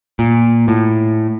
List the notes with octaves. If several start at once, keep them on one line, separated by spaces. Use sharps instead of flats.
A#2
A2